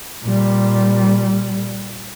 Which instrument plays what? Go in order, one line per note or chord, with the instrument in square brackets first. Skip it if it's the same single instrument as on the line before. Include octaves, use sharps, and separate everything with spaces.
[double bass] A#2 G3